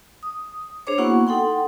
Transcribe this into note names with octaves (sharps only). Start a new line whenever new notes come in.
D#6
D4 G#4 C5 C#5 D6
A#3 B3 E4 F#4 F#5 C#6
D#4 A4 F#5 G5 C6